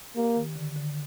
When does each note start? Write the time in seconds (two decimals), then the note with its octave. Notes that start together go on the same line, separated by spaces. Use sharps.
0.16 A#3 G4
0.36 D#3
0.56 D3
0.76 D3